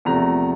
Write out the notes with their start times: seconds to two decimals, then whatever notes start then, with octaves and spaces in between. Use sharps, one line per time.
0.05 E2 C3 F3 A3 A#5